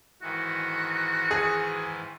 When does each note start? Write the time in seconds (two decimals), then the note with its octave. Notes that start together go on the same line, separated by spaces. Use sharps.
0.22 G#2 D#3 E3 F#4
1.31 G#4